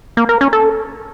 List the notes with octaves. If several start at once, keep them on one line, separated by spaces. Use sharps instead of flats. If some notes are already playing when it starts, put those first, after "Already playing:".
A#3
A#4
C#4
A4